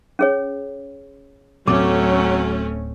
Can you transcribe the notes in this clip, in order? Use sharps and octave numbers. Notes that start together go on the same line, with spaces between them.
C#4 G#4 C#5
D1 F#3 A3 C4 C#4 D6